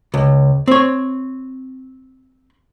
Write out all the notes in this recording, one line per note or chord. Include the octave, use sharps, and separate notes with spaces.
C#2
C4 C#5